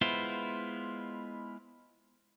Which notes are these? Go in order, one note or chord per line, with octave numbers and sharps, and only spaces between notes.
G#3 B3 E4 F4 C5